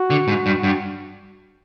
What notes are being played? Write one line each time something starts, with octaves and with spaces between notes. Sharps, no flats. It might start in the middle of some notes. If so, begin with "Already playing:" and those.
Already playing: F#4
D3
G#2
G2
G2